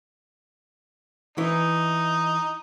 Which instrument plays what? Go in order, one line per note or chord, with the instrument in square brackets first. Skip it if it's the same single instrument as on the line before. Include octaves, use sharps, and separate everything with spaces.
[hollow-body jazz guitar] E3 [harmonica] D#4